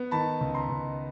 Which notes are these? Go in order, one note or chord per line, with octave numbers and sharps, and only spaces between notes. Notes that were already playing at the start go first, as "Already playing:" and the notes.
Already playing: B3
D#3 A5 B5
C#2
A#5 C6
C#2